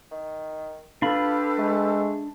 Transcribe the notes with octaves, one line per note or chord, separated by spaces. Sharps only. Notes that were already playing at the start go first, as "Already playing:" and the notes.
D#3
D4 F4 G4 A4 B4 B5
G#3 A3